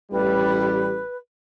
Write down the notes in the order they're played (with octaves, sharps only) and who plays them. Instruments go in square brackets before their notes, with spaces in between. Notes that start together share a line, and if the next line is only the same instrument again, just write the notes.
[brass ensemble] A1 G3 [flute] B4